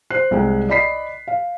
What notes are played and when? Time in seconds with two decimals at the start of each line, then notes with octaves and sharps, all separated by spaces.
0.10 C5 F#6 C7
0.31 C2 G#3 G5
0.69 D5 D#5 B5 B6 C7
1.28 F5